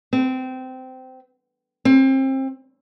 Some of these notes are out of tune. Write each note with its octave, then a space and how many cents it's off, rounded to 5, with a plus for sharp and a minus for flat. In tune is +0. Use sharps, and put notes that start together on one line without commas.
C4 -20
C4 +30